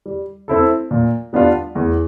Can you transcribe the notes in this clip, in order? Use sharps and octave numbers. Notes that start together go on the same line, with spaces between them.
G3
C4 E4 A4
A#2
G3 B3 D4 F4
E2